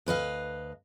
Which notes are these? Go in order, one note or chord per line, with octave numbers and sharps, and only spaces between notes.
D2 B4 D#5 F5